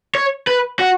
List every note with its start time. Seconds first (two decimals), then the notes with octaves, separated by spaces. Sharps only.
0.15 C#5
0.47 B4
0.79 F#4